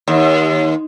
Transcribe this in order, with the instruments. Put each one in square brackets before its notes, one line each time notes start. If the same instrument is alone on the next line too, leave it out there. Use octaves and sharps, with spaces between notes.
[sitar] D#2